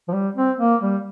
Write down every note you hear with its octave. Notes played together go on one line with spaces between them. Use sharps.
F3
G3
C4
A#3
G3